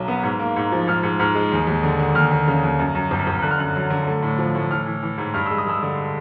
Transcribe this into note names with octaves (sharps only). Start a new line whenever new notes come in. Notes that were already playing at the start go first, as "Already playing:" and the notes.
Already playing: B1 F#3
B3
G#2
A#3
G#2
F3
G#2 F6
G#2
G#2 F6
G#3
D#2
D#2
D3
D3
D#2 F6
D#2
C#3
D#2
F#2
F#2
G1
G1
D3 F#6
F6
F#2 F#6
F#3
D3
A3
A2
F3
A2
E3 F6
E3
E3
G#2
G2 F6
G#3 E6
D#6
G#3 E6
D3